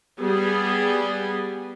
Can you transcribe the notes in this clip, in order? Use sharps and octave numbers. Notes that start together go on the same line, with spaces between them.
G3 B3 G#4